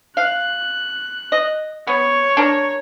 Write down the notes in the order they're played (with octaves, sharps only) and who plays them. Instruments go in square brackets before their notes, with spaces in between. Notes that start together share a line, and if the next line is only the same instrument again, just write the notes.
[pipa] F5 [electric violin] F#6
[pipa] D#5
[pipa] B3 [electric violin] C#5
[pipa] D4 A#4